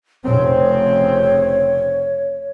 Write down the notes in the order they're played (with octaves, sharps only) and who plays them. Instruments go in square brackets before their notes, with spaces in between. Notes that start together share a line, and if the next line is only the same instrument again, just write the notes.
[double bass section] F1 C#3 C4 [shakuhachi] C#5